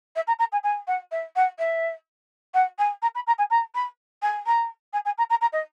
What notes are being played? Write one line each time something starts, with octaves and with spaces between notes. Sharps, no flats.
E5
A#5
A#5
G#5
G#5
F#5
E5
F#5
E5
F#5
G#5
A#5
B5
A#5
G#5
A#5
B5
G#5
A#5
G#5
G#5
A#5
A#5
A#5
D#5